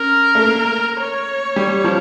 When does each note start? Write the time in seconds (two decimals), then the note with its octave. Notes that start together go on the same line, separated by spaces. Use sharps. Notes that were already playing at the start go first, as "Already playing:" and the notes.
Already playing: C#4 A#4
0.35 A3
0.45 A#3
1.01 C#5
1.56 G3
1.84 F3